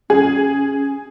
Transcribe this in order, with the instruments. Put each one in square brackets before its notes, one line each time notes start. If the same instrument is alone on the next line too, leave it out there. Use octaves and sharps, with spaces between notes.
[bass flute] C#4 [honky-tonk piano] G#4